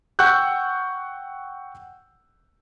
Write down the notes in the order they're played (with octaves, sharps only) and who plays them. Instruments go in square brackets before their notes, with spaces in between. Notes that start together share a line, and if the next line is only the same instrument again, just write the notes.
[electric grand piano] F#5 G5 C#6 E6 F#6 G6